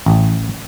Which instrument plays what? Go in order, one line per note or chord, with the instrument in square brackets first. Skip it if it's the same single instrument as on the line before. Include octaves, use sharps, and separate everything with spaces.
[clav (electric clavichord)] A1